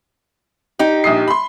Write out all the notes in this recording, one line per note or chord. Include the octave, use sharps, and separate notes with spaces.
D#4 G4
A#1 D#6 C7
B5 C6